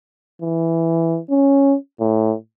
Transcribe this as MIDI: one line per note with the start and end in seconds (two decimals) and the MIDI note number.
0.42 1.19 52
1.30 1.76 61
2.00 2.35 45